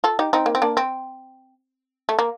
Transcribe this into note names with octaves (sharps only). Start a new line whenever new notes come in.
F4 A4
D#4 G4
C4 D#4
A#3
C4
A#3 D4
C4
A3
A#3